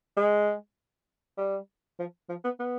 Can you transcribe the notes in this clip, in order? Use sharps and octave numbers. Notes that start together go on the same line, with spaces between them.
G#3
G3
F3
F3
B3
B3